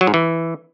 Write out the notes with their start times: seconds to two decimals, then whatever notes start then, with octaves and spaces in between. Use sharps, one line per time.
0.01 F#3
0.07 G#2
0.14 E3